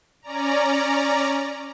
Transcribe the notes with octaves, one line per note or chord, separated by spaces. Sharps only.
C#4 D5 A#5